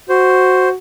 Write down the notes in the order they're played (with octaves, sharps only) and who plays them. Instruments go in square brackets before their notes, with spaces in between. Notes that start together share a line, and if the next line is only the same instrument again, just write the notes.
[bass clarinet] F#4 [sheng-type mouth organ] C5